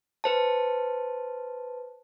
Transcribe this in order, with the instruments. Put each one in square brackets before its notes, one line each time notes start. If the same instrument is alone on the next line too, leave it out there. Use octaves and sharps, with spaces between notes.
[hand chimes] B4 C5 A5